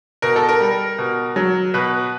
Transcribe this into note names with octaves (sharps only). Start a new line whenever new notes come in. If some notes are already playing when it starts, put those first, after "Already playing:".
B2 A#4
A4
A#4
G3
B2
F#3
B2 B4